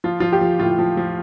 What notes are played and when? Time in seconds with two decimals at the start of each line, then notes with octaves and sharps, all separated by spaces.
0.04 F3 F4
0.20 F3 F4
0.32 G4
0.41 F3
0.59 A2 F4
0.79 F3
0.97 F3